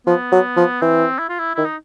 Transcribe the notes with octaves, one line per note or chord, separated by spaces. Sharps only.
F3 B3
F#3
F3
E3 C4
E4
F4
E4
D#3 E4
D#4